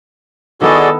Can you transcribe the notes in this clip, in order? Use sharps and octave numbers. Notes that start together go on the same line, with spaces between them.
D#3 B3 E4 F#4 G#4 A4 D5 D#5